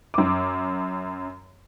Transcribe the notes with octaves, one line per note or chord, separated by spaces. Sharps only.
F#2 D6